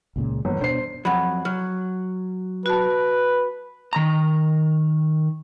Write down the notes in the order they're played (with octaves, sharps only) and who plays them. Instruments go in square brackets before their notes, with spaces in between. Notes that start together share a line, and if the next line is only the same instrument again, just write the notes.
[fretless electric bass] C#2 A#2 C#3
[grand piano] G1 [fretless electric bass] E3 A#3 B3
[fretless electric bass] B2 D4 [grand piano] C5 C7
[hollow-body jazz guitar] F2 F#3 [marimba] F#5 B5
[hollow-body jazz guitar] F#3 [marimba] F6
[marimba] F#4 A5 [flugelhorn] B4
[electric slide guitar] D#3 A#5